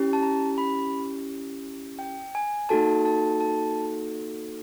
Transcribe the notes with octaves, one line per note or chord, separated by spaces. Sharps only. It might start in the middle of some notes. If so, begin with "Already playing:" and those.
Already playing: C#4 E4 G4
A5
A#5
B5
G5
G#5
A#3 D#4 F#4 A4 A5
A5
A5